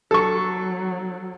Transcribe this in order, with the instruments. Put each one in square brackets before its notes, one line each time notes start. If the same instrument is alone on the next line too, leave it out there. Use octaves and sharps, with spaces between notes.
[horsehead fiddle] F#3 [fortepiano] A4 C#6